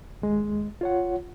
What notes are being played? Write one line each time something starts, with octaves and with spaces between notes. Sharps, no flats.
D#2 G#3
F4 C#5 F#5